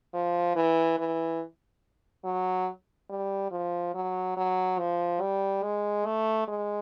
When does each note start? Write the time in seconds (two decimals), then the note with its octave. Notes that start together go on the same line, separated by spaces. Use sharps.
0.13 F3
0.55 E3
0.98 E3
2.25 F#3
3.10 G3
3.51 F3
3.94 F#3
4.37 F#3
4.79 F3
5.21 G3
5.63 G#3
6.06 A3
6.48 G#3